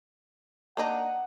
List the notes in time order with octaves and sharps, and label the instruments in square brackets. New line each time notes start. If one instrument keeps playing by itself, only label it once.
[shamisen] A#3 D4 D#4 [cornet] F#5